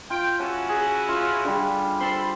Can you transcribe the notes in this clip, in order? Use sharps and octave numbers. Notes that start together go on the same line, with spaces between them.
F4 G5
C#4 E4 F#4 F#5 A5
G#4
F4
D3 G3
C4 A4 B5 C6